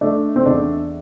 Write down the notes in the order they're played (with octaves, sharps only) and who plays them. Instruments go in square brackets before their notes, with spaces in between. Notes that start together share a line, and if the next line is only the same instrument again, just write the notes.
[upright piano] A3 D4
C4
E2 D4